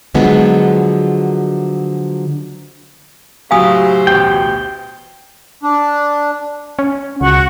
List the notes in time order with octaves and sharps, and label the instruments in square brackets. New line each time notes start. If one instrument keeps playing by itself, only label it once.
[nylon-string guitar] D3 F3 F#3 G#3 B3
[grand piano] A2 C#3 F#3 [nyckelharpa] G4 C5 [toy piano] F5 G#5 D#6
[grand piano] A1 D2 B2 [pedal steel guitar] G5
[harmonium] D4
[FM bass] C#4
[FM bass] C#2 [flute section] F#4 F#5 C#6